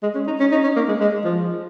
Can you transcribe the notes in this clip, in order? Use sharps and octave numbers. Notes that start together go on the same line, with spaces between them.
G#3
C#4
D#4
C#4
D#4
C#4
A#3
G#3
G#3
F3